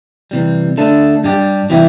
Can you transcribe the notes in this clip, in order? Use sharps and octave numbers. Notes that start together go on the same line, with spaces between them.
C3 E3 G3
D3 A3 D4 A4
G2 G3 D4 G4
C3 E3 G3 E4 G4